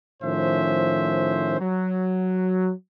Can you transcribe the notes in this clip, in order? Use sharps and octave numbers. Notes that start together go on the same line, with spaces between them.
A2 D#3 F3 C#4 C5 E5
F#3